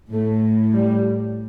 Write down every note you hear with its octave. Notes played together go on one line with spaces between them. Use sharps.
A2 A3
G3